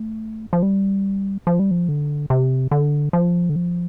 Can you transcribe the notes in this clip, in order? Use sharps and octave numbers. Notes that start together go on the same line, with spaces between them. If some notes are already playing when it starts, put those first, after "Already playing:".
Already playing: A3
F3
G3
F3
G3
F3
D3
C3
D3
F3
D3
F3